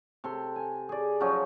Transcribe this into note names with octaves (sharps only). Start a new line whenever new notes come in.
C3 A4 C6
G#5
G#4 D5
F3 F#3 C#4 D#4